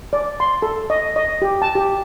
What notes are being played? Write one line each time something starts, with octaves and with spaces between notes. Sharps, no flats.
D5
C6
A4
D#5
D#5
G4
A5
G4